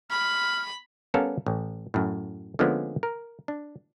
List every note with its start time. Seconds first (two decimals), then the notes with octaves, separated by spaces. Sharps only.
0.10 B5 F6
1.14 G3 B3 C#4 A4 A#4 F5
1.46 A1
1.94 F#2 A2
2.59 D3 F3 G#3 A#3 B3 C#4
3.03 A#4
3.48 D4